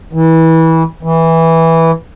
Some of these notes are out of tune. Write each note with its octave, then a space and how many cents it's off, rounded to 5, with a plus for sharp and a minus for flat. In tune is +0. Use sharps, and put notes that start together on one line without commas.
E3 -25
E3 -10